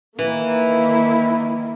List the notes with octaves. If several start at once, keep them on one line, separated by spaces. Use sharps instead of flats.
D#3 E3 A#3 E4